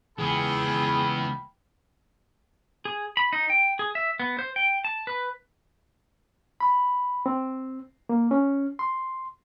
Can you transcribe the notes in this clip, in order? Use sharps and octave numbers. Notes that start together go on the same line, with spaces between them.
C#2 E3 B3 G#4 G5 B5
G#4
B5
D#4
G5
G#4
E5
B3
C5
G5
A5
B4
B5
C4
A#3
C#4
C6